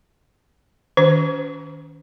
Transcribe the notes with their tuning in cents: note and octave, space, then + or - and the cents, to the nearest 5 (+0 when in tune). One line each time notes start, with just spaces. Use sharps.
D#3 +10 C#4 +40 B4 +30